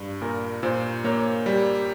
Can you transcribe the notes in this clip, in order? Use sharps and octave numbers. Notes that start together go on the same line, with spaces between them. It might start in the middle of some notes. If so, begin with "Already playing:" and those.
Already playing: G2
A#2 A#4
A#2 C5
A#3 C#5
G3